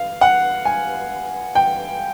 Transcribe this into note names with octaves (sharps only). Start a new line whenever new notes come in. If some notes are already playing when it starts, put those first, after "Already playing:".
Already playing: F5
F#5
G#5
G5